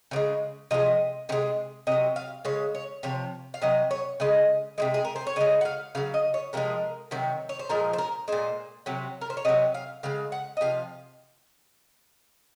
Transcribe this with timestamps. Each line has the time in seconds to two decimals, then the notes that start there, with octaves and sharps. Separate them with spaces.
0.11 C#3 F3
0.16 G#3
0.71 C3 F3 G#3 D#5
1.29 C3 D#3
1.32 G#3
1.87 C3 D#5
1.92 F#3
2.16 F5
2.45 C#3 G#3 C#5
2.75 C#5
3.03 C3 F3 C#5
3.54 F5
3.61 C3 F#3 D#5
3.91 C#5
4.20 C#3 G#3 D#5
4.78 C3 F3 G#3
4.94 G#4
5.05 A#4
5.16 C5
5.27 C#5
5.36 C#3 D#5
5.41 G#3
5.61 F#5
5.65 F5
5.95 C#3 F#3 F5
6.14 D#5
6.34 C#5
6.53 C3 F3 G#3 A#4
7.11 C3 D#3 F#3
7.49 C#5
7.59 C5
7.69 A#2 F3 G#3 A#4
7.93 C5
7.98 A#4
8.28 A#2 G#3 C5
8.86 C3 F#3
9.21 A#4
9.30 C5
9.37 C#5
9.45 C3 F#3 D#5
9.75 F5
10.03 C#3 G#3 F5
10.32 F#5
10.57 D#5
10.61 C3 F3 F5